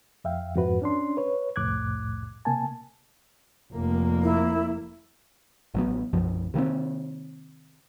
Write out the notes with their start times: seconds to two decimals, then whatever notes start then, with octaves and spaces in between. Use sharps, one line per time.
0.24 F2 E5 F5 G5
0.55 F2 G#2 F#4 B4
0.82 C#4 D4 C6
1.17 B4 C#5
1.56 C2 F2 A2 D6 F#6 G#6
2.45 C3 A#3 G#5 A5
3.73 F1 A#3
4.23 E4
5.74 A1 F#3 B3
6.13 B1 F#2 F3
6.54 C3 D#3 A#3 C4